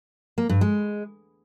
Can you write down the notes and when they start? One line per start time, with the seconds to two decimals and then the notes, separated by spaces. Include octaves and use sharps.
0.38 A#3
0.49 G2
0.61 G#3